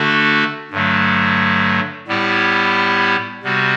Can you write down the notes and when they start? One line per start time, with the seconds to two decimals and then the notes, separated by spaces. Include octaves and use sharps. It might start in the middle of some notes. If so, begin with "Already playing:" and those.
Already playing: D3 A3 D4 F#4 A4
0.71 G2 D3 F#3 A3
2.07 A2 G3 B3 E4 G4
3.43 C3 G3 B3 F#4